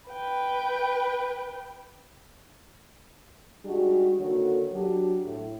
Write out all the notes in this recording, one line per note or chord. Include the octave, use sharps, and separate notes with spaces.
B4 G5
G3 G#3 D4 D#4 F#4 G#4
D3 D#3 A#3 F#4 A4 C#5
F#3 D4 F#4 G4
A2